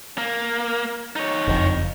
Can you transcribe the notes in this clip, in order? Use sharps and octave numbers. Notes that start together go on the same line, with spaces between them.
A#3
D#4 C#5
F#1 F2